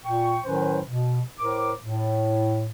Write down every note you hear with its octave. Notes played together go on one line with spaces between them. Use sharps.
A#2 G5 C#6
A2 D#3 F#3 C#4 B4 C5
B2
A2 A#4 C5 D6
A2